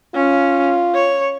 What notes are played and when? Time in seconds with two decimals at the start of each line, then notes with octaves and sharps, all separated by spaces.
0.15 C#4 F4
0.95 C#5